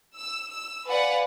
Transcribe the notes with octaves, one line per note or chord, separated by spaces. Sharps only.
E6
E6
B4 D5 F5 F#5 G#5